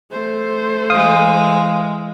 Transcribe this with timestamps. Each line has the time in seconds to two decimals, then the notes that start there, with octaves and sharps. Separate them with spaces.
0.11 A3 C5
0.90 E3 G#3 F5 D#6